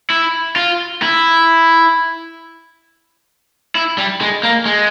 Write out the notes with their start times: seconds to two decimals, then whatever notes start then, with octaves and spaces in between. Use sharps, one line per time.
0.10 E4
0.56 F4
1.02 E4
3.75 E4
3.98 G3
4.21 G#3
4.43 A#3
4.66 G#3